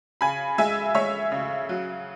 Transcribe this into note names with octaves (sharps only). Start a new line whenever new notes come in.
C#3 G#5 B5
G#3 E5 G#5
G#3 C#5 E5
C#3
F#3